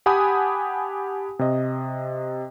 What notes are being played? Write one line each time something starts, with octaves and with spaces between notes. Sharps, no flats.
G4 F#5 G#5 A5 B5 D#6
C3 D#5